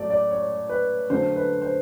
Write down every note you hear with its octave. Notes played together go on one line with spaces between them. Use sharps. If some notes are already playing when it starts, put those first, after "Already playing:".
Already playing: A2 F#3 A3 D5
D5
C#5
B4
D3 F#3 A3 C5
B4
C5